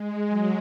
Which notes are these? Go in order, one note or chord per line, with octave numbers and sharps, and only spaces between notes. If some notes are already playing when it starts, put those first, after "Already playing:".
Already playing: G#3
F#3